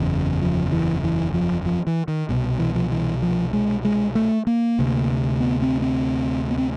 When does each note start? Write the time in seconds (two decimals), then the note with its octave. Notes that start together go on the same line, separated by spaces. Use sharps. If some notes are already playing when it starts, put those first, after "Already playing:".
Already playing: F#1 E2 C#3
0.42 F3
0.72 E3
1.04 E3
1.34 F3
1.66 F3
1.87 E3
2.08 D#3
2.29 C2 B2
2.59 E3
2.75 F3
2.91 E3
3.22 F3
3.53 G#3
3.85 G#3
4.15 A3
4.47 A#3
4.79 D2 C3
5.40 B3
5.62 C4
5.82 C4
6.51 B3
6.58 C4